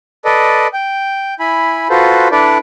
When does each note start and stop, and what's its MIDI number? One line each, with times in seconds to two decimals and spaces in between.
0.25 0.67 69
0.25 0.67 71
0.25 0.67 74
0.25 0.67 75
0.73 1.34 79
1.39 1.88 64
1.39 1.88 80
1.39 1.88 83
1.90 2.28 65
1.90 2.28 66
1.90 2.28 69
1.90 2.28 71
1.90 2.28 72
2.31 2.58 62
2.31 2.58 64
2.31 2.58 69
2.31 2.58 71
2.31 2.58 74